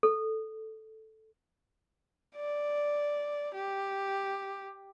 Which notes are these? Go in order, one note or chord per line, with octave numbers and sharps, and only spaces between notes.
A4
D5
G4